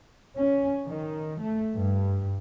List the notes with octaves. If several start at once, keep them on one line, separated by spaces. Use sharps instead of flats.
C#4
D#3
A3
G2